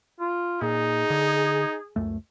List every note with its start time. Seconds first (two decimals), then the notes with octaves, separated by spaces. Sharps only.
0.19 F4
0.62 A#2 D#4 G#4
1.10 D3
1.96 C#2 F#2 A3